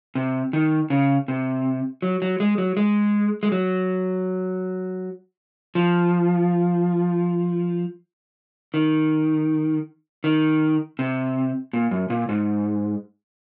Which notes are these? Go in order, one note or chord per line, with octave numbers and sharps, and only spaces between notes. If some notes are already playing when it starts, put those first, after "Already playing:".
C3
D#3
C#3
C3
F#3
F#3
G#3
F#3
G#3
G#3
F#3
F3
D#3
D#3
C3
A#2
F#2
A#2
G#2